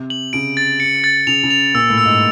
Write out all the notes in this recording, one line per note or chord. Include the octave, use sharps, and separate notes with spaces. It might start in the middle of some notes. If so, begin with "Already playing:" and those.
Already playing: C3
F#7
C#3 D7
A6
C#7
A6
C#3 F7
C#3
F7
A#2 E6
A2
E6
G#2